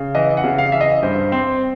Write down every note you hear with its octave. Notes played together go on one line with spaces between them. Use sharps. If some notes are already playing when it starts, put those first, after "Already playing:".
Already playing: C#3
E3 D#5
F#5
C#3
F5
E3 E5
D#5
G2 C5
C4